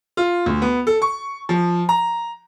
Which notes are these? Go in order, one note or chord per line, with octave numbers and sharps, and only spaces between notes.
F4
D2
B3
A4
C#6
F3
A#5